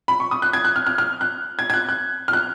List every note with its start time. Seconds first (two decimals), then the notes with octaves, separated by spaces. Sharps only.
0.08 B5
0.20 C#6
0.31 D#6
0.42 F#6
0.53 G#6
0.65 F#6
0.76 F6
0.87 F6
0.98 F6
1.21 F#6
1.59 G#6
1.70 G#6
1.74 F#6
1.89 F#6
2.28 F6
2.33 F#6